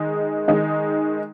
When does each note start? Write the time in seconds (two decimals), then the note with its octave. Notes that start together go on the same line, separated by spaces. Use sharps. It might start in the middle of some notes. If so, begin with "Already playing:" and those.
Already playing: D#3 G#3 D#4
0.48 D#3 G#3 D#4